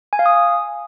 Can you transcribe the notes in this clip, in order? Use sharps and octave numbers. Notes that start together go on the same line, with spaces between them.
G#5
F5
D#6